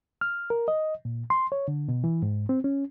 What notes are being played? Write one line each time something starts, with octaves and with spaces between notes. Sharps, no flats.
F6
A#4
D#5
A#2
C6
C#5
D3
B2
E3
G#2
C4
C#4